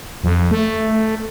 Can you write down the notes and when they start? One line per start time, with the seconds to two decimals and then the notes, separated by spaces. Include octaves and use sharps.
0.24 F2
0.51 A3